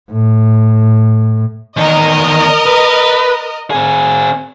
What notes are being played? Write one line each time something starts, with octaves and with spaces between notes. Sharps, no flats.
A2
E2 D#3 A#4 D#5
B4
C4 G#4